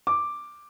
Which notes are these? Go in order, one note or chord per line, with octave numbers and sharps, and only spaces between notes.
D6